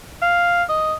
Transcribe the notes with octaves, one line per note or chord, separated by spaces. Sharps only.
F5
D#5